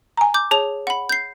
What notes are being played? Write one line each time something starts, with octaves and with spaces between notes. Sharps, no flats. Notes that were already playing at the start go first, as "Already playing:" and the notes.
G#5 A#5
D6 G6
G#4 C#5 A5 F7
F#5 B5
G6 C7